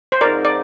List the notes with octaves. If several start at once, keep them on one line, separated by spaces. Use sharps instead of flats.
C5
G#2 F3 C4 D#4 A#4 D5
D5